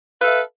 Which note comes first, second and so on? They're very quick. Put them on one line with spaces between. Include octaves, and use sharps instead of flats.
F5 B4 A4 E5